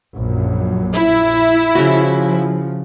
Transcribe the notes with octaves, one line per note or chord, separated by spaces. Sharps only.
A#1 F#2
E4
C#3 F3 F#4